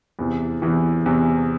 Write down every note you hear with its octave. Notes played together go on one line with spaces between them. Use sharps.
E2 C3 E3
E2 C3 E3
E2 C3 E3